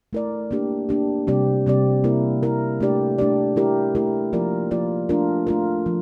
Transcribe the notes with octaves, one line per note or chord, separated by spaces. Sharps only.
A3 E4 A#4 D5
A#3 D4 G4
A#3 D4 G4
C3 G3 C4 G4 D5
C3 G3 C4 G4 D5
A#3 E4 A#4
A#3 E4 A#4
A3 D4 G4 D5
A3 D4 G4 D5
A3 E4 G4 A#4
A3 E4 G4 A#4
F3 A#3 F4 A#4 D5
F3 A#3 F4 A#4 D5
A3 D4 F4 A#4
A3 D4 F4 A#4
F3